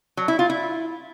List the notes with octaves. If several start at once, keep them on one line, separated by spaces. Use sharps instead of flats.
F#3
E4
F4
E4